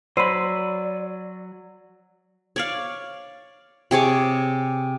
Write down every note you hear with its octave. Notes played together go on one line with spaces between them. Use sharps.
F#3 C5 D5 B5 E6 C7 D#7
C#5 D5 F5
C3 G#4 C#5 D6